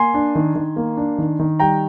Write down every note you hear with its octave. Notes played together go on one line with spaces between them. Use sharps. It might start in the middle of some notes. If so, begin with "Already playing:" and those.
Already playing: A#3 G#5 C6
D4
D#3
D#3
A#3
D4
D#3
D#3
G3 G5 A#5